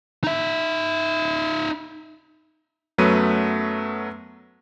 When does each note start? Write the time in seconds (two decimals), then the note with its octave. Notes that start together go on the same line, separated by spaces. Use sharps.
0.24 D#4 E5
2.98 F#2 F#3 A3 B3 B4 D#7